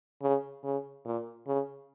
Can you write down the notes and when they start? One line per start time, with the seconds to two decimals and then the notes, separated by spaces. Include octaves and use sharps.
0.22 C#3
0.63 C#3
1.05 A#2
1.47 C#3